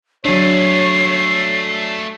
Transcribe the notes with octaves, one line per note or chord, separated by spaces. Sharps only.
F#3 A3 D4 G#4 C#5 C7